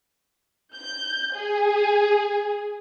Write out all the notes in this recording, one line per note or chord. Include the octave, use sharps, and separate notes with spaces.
G6
G#4